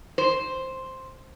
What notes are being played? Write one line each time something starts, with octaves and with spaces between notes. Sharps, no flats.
C5